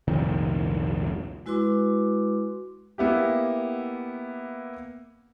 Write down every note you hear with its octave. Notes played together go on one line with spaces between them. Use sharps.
F1 C2 A#2 D#3
G#3 E4 F#4 B4 C6 D6
A#3 B3 E4 G4